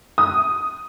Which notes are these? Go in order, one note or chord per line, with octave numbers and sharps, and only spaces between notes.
D#6